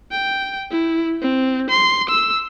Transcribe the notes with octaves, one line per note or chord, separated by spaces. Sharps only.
G5
E4
C4
C6
E6